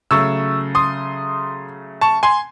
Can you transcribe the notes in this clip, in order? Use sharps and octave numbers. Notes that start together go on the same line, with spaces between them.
C#3 F#3 A3 C#6 E6
C6 D#6
A5 C#6
G#5 C6